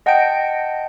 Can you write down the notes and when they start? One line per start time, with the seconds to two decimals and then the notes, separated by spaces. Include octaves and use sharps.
0.06 D#5 F#5 G5 A5 G6 D7